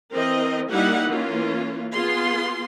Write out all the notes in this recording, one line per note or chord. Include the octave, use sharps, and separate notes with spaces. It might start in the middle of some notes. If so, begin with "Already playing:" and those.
E3 C4 A#4 D#5
G3 A#3 D#4 E4 G4 F#5
E3 A#3 C#4 F4
B3 F4 G#4 C6